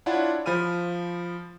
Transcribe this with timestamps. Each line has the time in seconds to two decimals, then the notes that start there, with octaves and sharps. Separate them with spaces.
0.06 D4 E4 F4 C#5 F#5
0.46 F3 B5 F6 D#7